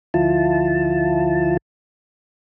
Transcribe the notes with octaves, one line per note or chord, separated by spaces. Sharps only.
D2 F3 E4 F4 A5